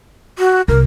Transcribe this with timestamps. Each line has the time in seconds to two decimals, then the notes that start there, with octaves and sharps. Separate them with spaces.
0.39 F#4
0.68 C2 A#4